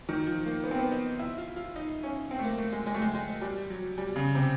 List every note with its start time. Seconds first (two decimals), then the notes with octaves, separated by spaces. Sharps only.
0.09 D#3
0.27 F3
0.46 A#3
0.64 B3
0.71 C4
0.79 B3
0.92 D#4
1.19 E4
1.38 F4
1.56 F4
1.76 D#4
2.03 C#4
2.31 C4
2.39 A3
2.44 A#3
2.58 A3
2.73 G#3
2.87 G#3
2.94 A3
3.02 G#3
3.15 G#3
3.41 G3
3.70 F#3
3.98 G3
4.16 C#3
4.35 C3